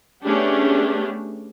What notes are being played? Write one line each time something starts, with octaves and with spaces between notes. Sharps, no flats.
A3 B3 C#4 D4 G4 G#4